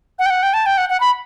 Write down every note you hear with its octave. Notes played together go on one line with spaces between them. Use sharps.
F#5
G5
F#5
G5
A5
G5
F#5
F#5
B5